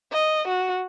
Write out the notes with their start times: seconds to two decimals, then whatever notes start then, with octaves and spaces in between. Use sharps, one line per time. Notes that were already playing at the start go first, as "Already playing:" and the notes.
0.12 D#5
0.48 F#4